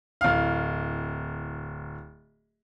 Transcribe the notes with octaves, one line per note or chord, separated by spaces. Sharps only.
D1 F5